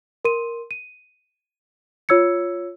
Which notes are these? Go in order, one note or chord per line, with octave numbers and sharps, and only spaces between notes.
A#4 C6 D#7
D#7
F4 C#5 E6 G#6 C#7